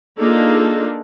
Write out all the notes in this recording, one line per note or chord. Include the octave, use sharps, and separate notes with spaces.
A#3 D4 D#4 F4 G#4 A4